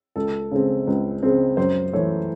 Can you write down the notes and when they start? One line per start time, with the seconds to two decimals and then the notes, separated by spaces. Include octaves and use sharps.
0.16 C#2 A4
0.51 C#3 G#3 C4
0.87 C#2
1.23 C#3 G#3 C4
1.57 F#2 C5
1.93 E3 A3 C#5